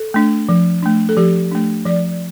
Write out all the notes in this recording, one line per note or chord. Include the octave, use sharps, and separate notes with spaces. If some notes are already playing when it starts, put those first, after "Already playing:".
Already playing: A4
A3 D4
F3
A3 D4
A4
F3 G4
A3 D4
F3 D5